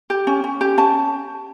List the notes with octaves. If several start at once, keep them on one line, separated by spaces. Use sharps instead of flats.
G4
C#4
C#4
G4
C#4 A5